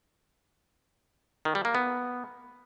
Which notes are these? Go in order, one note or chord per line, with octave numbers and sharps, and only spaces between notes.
D#3
G3
A#3
B3